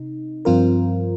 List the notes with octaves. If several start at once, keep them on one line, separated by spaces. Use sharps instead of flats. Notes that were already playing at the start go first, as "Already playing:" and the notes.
Already playing: C3 D#4
G2 F3 C4 F4 A#4